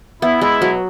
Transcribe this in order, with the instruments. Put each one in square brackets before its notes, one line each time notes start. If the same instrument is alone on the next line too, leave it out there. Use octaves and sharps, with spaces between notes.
[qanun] B3 [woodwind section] E4
[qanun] G#3 [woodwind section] E4
[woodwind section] B2 [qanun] F#3